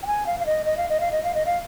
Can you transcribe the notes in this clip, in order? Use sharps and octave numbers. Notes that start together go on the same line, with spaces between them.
G5
G#5
F5
F5
D#5
D#5
F5
D#5
F5
D#5
F5
D#5
F5